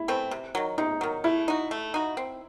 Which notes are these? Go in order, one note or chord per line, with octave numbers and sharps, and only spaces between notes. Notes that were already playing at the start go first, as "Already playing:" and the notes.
Already playing: E4
E3 A3 C4
C3
D#3 F#3
C3 D#4
D#3 F#3
A3 E4
D#4 F#4
A3
D#4 F#4
C4